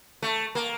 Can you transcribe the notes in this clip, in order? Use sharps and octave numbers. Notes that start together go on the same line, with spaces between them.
A3
A#3